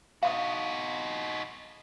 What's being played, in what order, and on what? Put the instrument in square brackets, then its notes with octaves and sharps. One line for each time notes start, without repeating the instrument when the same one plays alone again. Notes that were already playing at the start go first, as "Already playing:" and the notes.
[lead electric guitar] D#4 F#4 [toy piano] F5 C6 D#6